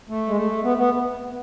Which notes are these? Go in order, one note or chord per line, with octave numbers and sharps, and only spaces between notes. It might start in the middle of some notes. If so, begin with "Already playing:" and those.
A3
G#3
A3
B3
B3